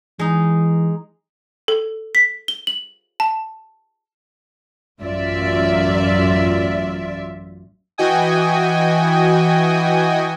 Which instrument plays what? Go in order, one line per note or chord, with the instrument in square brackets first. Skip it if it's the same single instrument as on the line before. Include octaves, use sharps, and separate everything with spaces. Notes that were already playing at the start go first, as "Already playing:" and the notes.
[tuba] E3 [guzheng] G#3 D#4
[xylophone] A4
B6
G7
F#7
A5
[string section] A1 F#2 F4 D5 E5
[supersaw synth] E3 F#4 D#5 G5 G#5 D#6